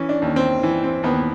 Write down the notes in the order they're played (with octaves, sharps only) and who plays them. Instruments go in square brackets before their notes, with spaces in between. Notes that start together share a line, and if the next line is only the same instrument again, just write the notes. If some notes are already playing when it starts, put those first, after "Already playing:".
Already playing: [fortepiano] E3 C#4
D4
D#2
C4
E3
C4
D#2 B3